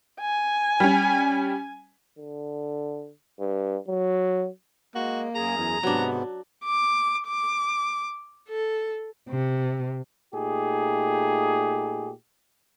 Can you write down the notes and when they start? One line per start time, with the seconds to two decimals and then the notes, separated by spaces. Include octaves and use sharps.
0.20 G#5
0.80 G3 C#4
2.18 D3
3.40 G2
3.88 F#3
4.95 G#3 A#3 F#4
5.35 F#2 G#4 A#5
5.57 E2
5.83 G#2 C3 F#3 B3 D4
6.65 D6
7.27 D6
8.48 A4
9.29 C3
10.34 A#2 A3 D#4 G4 G#4